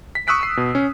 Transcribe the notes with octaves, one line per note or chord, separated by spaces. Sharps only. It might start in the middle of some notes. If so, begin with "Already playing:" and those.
B6
C#6 D#6 E6 F#6 B6 D7
F#6 C7
B2
C#4